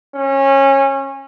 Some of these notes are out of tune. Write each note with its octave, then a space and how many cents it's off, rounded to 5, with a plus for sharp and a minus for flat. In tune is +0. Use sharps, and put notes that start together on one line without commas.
C#4 -25